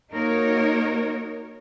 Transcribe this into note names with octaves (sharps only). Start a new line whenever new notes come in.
A#3 D#4 F#4 A#4 C#5